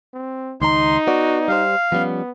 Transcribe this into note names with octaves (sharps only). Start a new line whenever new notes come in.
C4
C#2 D#3 D#4 A#5 C6
B3 F#4 D5
G3 G4 C5 F5
F3 G3 B3 C#4